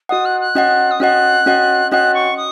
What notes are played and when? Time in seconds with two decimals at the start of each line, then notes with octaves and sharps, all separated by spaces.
0.09 F#4 D#5 F#5 D#6
0.25 F#6
0.40 F#6
0.55 C#4 F#4 D#5 F#5
0.91 D#6
1.00 C#4 F#4 D#5 F#5 F#6
1.46 C#4 F#4 D#5 F#5
1.91 C#4 F#4 D#5 F#5 F#6
2.14 C#6
2.37 D#6